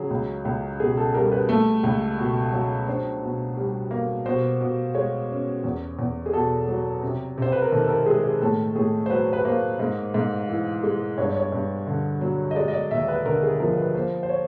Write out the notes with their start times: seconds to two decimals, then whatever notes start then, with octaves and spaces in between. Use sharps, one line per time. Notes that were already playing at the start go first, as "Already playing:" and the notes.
Already playing: C#3 F#3 G#4
0.10 C#2
0.45 C#2
0.80 B2 G#4
0.97 A4
1.14 G3 A#4
1.32 B4
1.49 A3
1.83 C#2
2.18 B2
2.53 F#3
2.87 D4 C5
3.22 B2
3.57 G3
3.91 A#3
4.26 B2 C5
4.61 B2
4.94 G#3 C#5
5.30 C#4
5.64 E2
5.99 E2
6.26 G#4
6.33 B2 A4
6.68 F#3
7.03 C3
7.38 C3 C5
7.52 B4
7.62 A#4
7.71 D#3 A4
7.84 A4
7.89 A#4
8.06 G#3 G#4
8.24 G#4
8.41 A2 A4
8.75 A2 G#4
9.06 C5
9.10 F#3 B4
9.33 B4
9.45 A#3 C5
9.79 G#2
10.14 G#2
10.48 E3
10.83 G#3
11.18 G2 C#5
11.27 D5
11.36 C#5
11.52 G2
11.87 D3
12.21 F#3
12.51 D#5
12.56 G#3 D5
12.68 D#5
12.73 D5
12.91 D#2 E5
13.08 B4
13.25 D3 A#4
13.43 G#4
13.60 F3 A#4
13.78 B4
13.94 A#3 C5
14.23 C5
14.29 C#5